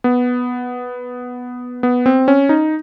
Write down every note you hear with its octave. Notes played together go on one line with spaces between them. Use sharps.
B3
B3
C4
C#4
D#4